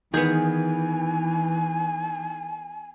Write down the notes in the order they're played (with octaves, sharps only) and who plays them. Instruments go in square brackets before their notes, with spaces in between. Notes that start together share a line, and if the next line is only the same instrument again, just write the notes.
[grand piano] D#3 G6 [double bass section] E3 [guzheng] B3 G#4 [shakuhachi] G#5